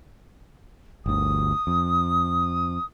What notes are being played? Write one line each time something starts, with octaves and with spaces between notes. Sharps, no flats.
G1 D2 D#6
F2